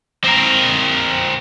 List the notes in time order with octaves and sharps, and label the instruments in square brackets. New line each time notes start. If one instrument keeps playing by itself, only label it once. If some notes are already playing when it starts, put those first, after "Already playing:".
[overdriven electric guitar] C4 A#4